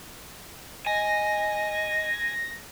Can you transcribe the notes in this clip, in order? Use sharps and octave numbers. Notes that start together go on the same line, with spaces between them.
D#5 G#5 A#6